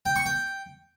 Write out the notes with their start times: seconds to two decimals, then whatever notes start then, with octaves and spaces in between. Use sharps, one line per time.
0.06 G5
0.16 C#6
0.26 G5